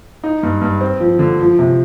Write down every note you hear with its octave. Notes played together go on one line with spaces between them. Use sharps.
D#4
G2
G2
C4
F3
D3
F3
C3